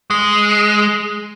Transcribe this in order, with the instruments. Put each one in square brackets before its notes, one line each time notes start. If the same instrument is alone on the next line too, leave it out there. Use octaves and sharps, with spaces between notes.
[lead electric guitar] G#3